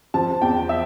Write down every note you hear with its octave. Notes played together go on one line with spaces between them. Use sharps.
F3 A5
E2 G5
E5